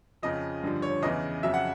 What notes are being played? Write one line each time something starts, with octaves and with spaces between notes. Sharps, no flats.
F2 C#3 F3 D#5
G2 D3 F3
C#5
E2 C#3 E3 D#5
F2 C#3 F#3 E5
F#5